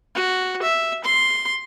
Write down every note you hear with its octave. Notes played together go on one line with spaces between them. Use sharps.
F#4
E5
C6